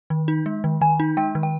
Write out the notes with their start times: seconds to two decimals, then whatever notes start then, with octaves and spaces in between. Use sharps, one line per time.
0.10 D#3
0.28 D#4
0.46 G#3
0.64 D#3
0.81 D#3 G#5
1.00 D#4
1.17 G#3 G5
1.35 D#3
1.43 G5